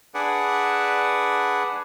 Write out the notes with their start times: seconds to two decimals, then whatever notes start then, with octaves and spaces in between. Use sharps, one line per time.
0.14 D4 G#4 B4 D5 F#5